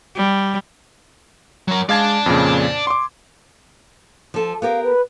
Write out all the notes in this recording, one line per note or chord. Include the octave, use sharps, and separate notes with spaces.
G3
F#3 A#4
G#3 D5 F5 A5 G#6
F2 A#2 C#3
C6 D6
F3 A4
B3 G4 A#4 F5
B4